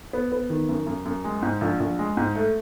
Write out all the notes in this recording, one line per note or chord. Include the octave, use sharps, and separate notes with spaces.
B3
B3
D#3
F#2
F#2
F#2
G#3
G#2
A#1
A#1
G#3
G#2
A3